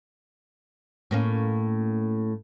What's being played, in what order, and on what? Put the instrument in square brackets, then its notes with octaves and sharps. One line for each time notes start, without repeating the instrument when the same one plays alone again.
[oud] A2 A#3 C#4